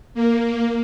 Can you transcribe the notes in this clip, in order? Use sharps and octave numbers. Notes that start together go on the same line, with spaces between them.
A#3